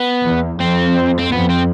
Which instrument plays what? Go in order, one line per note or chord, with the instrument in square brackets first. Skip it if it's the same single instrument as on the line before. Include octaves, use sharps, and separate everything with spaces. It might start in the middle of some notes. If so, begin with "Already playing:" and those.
Already playing: [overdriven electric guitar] B3
[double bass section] E2
[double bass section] F2 [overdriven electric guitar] C4
[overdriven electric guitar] C4
[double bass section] F2 [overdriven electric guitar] B3
[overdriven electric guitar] C4